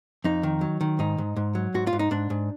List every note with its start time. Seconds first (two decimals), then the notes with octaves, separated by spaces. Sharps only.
0.24 F2 D#4
0.43 D#3
0.61 F#3
0.81 D#3
0.99 G#2 D#4
1.18 G#2
1.37 G#2
1.55 F#3
1.74 G#2 F#4
1.87 F4
1.93 G#2
1.99 D#4
2.11 G#2 D4
2.30 G#2